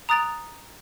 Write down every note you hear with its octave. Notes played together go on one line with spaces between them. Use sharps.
A#5 D#6 F#6 A6 D7 F7